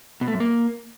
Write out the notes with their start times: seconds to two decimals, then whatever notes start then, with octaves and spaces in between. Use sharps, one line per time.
0.21 B2
0.28 A3
0.34 F#2
0.40 A#3